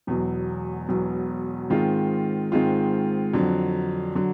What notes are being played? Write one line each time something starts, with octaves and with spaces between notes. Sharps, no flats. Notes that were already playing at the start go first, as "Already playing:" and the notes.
E1 E2 B2 F#3
E1 E2 B2 F#3
G#2 D#3 G#3 C4 F4
G#2 D#3 G#3 C4 F4
F2 D3 F#3
D3 F#3